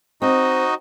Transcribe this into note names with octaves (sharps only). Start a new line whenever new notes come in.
C4 D#4 F#4 D#5